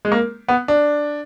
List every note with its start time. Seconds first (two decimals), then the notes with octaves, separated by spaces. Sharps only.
0.05 G#3
0.12 A#3
0.48 B3
0.68 D4